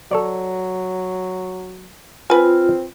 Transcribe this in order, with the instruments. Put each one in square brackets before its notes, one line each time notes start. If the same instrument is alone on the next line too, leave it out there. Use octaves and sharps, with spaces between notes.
[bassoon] F#3 [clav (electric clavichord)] A4 C#5 D5
[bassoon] C4 [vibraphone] F4 [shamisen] B4 G#5